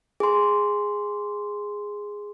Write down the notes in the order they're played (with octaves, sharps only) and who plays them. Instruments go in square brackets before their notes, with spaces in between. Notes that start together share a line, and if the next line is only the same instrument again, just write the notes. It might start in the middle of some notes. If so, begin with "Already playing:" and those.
[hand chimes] G#4 C6